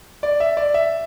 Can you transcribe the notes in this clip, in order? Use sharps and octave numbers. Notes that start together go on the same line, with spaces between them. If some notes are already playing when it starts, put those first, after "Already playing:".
D5
E5
D5
E5